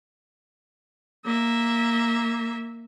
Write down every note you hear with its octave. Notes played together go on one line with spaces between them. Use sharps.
A#3 E5